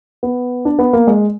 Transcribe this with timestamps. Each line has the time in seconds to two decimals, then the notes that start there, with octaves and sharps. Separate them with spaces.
0.23 B3
0.65 D4
0.79 B3
0.93 A#3
1.07 G#3